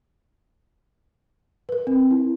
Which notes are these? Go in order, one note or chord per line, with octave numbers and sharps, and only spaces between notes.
A#4 B4
C4
E4